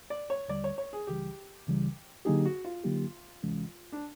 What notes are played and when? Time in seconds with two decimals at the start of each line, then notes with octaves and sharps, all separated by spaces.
0.10 D5
0.30 C#5
0.48 D#2 D3 G3 D5
0.64 C#5
0.78 C#5
0.93 G#4
1.07 C#2 C#3 E3 G3 G4
1.66 C#2 C#3 E3 G3
2.25 D3 F#3 A#3 D#4 G4 G#4
2.45 F#4
2.64 F4
2.84 D3 F#3 A#3 D#4 G4
3.43 D2 C3 E3 G#3 C#4
3.92 D4